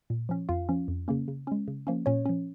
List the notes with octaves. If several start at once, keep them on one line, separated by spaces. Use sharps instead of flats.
A#2
F3 C#4
F2 F4 F5
F3 C#4
F2
C#3 A#3 C#4
C#3
G#3 C#4
C#3
F3 A#3 C#4
A#2 C#4 C#5
F3 C#4